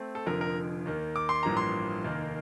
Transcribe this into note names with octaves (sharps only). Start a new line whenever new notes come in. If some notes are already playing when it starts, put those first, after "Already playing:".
Already playing: A3 C4
A4
F1 F2 D3 F3 A#4
A#4
D#2 D#3 A#3
D6
C6
A1 G2 F3 A#3 A#5
C6
F1 D#2 D#3 A#3